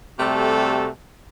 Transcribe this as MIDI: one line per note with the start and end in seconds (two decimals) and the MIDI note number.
0.20 0.88 48
0.20 0.88 55
0.20 0.88 57
0.20 0.88 66
0.20 0.88 69